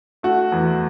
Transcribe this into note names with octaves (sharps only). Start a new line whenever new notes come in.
A3 F#4
E2